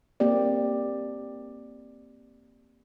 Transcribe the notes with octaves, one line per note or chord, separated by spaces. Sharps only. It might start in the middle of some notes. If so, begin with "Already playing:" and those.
A#3 C4 G4 D5